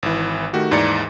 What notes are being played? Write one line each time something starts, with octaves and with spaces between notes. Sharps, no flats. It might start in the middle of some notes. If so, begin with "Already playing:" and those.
G#1 E3
D#3 A3 F#4 G4
D#2 G#2 E3 D5 A#5 C#7